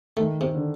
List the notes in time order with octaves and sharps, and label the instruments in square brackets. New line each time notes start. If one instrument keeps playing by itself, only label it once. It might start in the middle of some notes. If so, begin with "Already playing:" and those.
[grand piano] D#3 [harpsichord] A3
[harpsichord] C3
[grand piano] D3